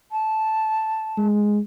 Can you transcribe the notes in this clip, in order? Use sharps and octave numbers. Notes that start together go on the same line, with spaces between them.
A5
G#3